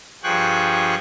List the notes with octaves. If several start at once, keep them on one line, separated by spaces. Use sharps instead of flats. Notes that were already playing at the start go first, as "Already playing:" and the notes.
G2 F3 G#4 G5 C#6 F#6